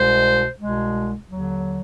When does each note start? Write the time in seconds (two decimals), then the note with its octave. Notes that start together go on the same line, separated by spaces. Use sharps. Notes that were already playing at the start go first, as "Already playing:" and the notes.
Already playing: C2 B2 G#3 C5
0.60 C2 B2 G#3
1.29 D#2 D3 F#3